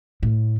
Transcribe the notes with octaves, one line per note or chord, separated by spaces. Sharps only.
A2